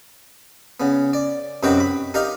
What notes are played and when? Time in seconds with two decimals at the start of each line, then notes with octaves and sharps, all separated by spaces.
0.80 C#3 B3
1.13 D5
1.63 F#2 C3 D#4 F#4 B4 G5
1.80 B5
2.14 D#4 G4 A#4 D#5 F5 A#5